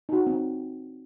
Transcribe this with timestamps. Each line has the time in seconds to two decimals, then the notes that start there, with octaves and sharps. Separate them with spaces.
0.09 D#4 F#4
0.27 C4